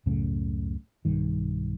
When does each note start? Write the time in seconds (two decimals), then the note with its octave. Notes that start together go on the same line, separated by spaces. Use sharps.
0.06 C#2 F#2 A2 C#3
1.05 B1 G2 D#3